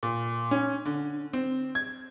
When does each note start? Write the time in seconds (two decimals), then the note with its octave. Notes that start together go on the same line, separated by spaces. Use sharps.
0.03 A#2
0.51 C#4
0.85 D3
1.33 C4
1.75 G#6